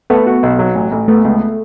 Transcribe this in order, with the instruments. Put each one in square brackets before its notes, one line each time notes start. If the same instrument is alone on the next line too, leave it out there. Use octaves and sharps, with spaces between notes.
[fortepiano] A3 [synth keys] B3
[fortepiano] F#4
B1
F#3
A1
A1
[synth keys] A3 [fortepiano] B3
[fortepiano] C#2